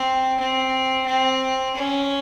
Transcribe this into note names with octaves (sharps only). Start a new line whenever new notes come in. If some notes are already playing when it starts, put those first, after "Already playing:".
Already playing: C4
C4
C4
C#4